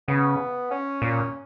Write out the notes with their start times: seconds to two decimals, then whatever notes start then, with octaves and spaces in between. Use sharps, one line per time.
0.08 C#3 B3
0.71 C#4
1.02 A#2